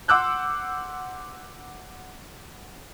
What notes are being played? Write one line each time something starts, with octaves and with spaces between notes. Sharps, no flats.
F#5 C6 D6 E6 F#6 G6